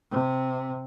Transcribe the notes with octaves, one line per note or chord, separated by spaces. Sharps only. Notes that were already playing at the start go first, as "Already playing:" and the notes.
C3